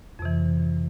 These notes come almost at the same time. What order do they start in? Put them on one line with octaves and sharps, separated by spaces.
F2 C3 E3